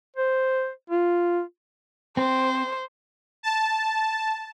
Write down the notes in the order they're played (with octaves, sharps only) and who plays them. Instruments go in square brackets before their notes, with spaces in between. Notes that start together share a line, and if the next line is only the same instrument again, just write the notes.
[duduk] C5
F4
[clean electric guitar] C4 [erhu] C5
[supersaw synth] A5